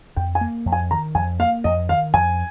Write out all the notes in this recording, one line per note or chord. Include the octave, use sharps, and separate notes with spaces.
F2 G5
G#5
A#3
F2
G#5
D#3 A#5
F2 G#5
A#3 F5
F2 D#5
D#3 F5
F2 G#5